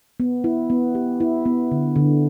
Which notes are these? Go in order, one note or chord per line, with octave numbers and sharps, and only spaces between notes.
B3
E4
B3
G4
E4
B3
D3
D3